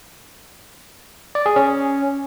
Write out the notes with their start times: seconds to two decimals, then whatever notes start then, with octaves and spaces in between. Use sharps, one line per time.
1.35 D5
1.46 G#4
1.56 C#4